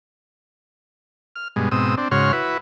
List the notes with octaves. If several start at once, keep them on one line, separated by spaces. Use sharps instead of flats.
F6
G2 B2 G#3
G#2 B2 C4 D#6 E6
C4 D4
G#2 C#3 F#4 C#5 C6 F6
E4 F#4 B4